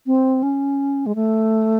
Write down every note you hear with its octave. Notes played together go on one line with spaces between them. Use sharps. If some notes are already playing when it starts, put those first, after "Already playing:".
C4
C#4
G#3
A3